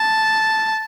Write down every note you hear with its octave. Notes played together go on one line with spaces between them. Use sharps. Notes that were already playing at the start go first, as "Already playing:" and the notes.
Already playing: A5